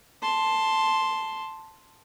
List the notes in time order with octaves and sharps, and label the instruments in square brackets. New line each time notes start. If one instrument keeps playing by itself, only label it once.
[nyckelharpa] A5 C6